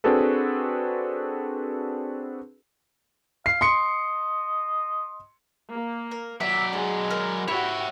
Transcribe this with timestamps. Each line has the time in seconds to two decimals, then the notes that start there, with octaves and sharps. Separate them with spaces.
0.04 C4 D4 F#4 G#4 A4 B4
3.46 F5 C7
3.61 D#5 C6 C#7
5.73 A#3
6.11 A#4
6.41 F#3 D5 E5
6.73 G#3 D4
7.10 A#4
7.48 E4 F#4 G4 C#5 E5